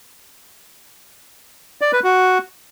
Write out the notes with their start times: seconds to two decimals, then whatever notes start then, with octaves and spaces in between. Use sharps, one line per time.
1.81 D5
1.93 B4
2.04 F#4